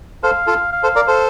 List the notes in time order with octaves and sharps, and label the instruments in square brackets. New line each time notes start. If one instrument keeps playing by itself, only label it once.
[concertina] A4 C5 [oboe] F5
[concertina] F4 A4
[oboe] F5
[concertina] A4 C5
A#4 D5
A4 C5